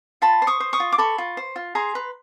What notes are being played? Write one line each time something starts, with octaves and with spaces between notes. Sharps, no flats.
F4 A5 B5
C5
C#6 D#6
C5
C#6 D#6
F4
D6
A4 B5 C#6
F4
C5
F4
G#4 A#5 C6
B4